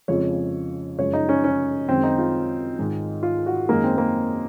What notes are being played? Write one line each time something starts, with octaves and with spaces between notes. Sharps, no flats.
F2 C#3 F3 G#3 C#5
F#2 C#3 F3 G#3 C#5
D#4
C#4
C#4
F#2 D#3 G#3 C4
D#4
F4
G#2 D#3 G#3
F4
F#4
F#2 D#3 G#3 A#3
C4
A#3